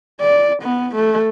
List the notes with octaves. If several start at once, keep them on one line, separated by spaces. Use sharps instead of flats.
D5
B3
A3